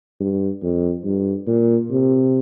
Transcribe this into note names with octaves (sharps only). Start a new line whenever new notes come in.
G2
F2
G2
A#2
C3